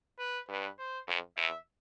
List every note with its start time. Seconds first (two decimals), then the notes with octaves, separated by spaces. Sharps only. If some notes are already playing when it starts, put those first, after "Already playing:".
0.19 B4
0.48 G2 B4
0.78 C5
1.08 F2
1.37 E2 E5